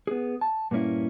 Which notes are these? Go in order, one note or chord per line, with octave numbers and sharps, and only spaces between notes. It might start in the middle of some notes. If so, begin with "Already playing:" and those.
B3 G#4
A5
G2 A#2 A#3 C#4 E4